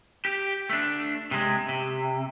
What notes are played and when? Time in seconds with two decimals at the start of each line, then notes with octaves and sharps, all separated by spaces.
0.25 G4
0.70 A3 D4
1.31 C3 G#3
1.68 C3